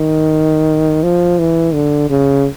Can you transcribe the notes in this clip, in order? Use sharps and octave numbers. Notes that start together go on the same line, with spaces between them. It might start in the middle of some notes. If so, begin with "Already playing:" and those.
Already playing: D#3
F3
E3
D3
C#3